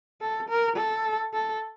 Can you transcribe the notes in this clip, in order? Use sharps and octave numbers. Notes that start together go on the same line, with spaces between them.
A4
A#4
A4
A4